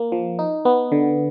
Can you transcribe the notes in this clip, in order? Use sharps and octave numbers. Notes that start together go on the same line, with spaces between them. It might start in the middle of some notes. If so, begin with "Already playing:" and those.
Already playing: A#3
F3
D#4
B3
D3